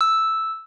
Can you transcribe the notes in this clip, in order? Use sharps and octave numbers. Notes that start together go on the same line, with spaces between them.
E6